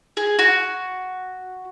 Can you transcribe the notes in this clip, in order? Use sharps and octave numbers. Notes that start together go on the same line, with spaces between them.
G#4
F#4